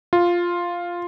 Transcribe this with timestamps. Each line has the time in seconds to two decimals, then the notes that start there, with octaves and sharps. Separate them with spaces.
0.13 F4